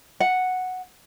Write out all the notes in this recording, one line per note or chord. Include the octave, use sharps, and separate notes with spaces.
F#5